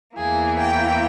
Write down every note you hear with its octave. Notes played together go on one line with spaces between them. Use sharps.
E2 E3 A#3 G#4
G5